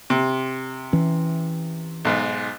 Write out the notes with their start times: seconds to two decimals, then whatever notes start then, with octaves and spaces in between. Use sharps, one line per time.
0.10 C3
0.93 E3 C#4
2.05 B1 G#2